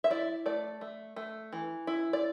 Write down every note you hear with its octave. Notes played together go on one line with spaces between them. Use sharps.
E5
E4 D5
A3 D5
A3
A3
E3
E4
D5